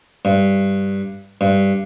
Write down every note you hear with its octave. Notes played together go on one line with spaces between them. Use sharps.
G2
G2